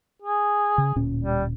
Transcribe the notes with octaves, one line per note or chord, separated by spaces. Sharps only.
G#4
C#3
D1 A#2 C#4
G3